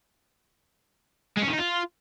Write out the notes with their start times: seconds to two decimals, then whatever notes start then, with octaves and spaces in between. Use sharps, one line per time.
1.37 G#3
1.42 C#4
1.48 D#3
1.53 D#4
1.58 F4